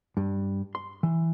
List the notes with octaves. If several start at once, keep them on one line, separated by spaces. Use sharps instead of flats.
G2
C6
E3